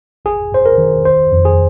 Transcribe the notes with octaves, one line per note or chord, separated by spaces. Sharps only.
G#1 G#4
G2 C5
A#4
D#3
G1 C5
F2
G#4